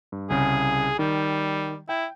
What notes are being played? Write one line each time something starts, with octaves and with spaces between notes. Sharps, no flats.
G2
C2 C#3 G#4
D#3 G3
E4 G5